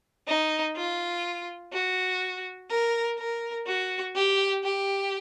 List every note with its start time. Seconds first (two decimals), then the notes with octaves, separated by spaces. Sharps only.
0.27 D#4
0.76 F4
1.73 F#4
2.70 A#4
3.19 A#4
3.67 F#4
4.15 G4
4.64 G4